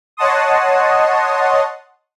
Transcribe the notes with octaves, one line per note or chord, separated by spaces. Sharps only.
C#5 D#5 F#5 A5 C6 D#6